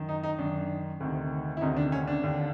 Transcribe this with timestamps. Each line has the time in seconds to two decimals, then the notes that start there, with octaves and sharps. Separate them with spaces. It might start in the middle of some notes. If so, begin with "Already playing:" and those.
Already playing: F#2 D#3
0.09 D#4
0.23 D#4
0.39 F#2 D#3 D4
1.00 D2 C3 D#3
1.57 E4
1.61 D2 C3 D#3 D#4
1.77 D4
1.92 C#4
2.07 D4
2.23 D#2 D3